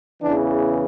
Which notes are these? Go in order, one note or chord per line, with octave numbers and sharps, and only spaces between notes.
E2 C#3 E3 D4